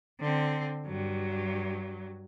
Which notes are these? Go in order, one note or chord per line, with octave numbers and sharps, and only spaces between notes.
D3 C4
G2 F#3